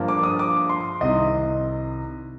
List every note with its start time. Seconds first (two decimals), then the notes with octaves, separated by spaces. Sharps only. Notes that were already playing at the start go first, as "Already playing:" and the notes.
Already playing: G2 F3 A#3
0.08 D6
0.23 D#6
0.39 D6
0.69 C6
1.01 C2 C3 D#3 D#5